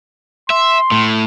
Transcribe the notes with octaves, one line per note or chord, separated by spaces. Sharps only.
E5 C6
A2